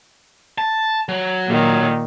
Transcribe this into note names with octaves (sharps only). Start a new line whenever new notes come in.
A5
F#3
A#2 D#3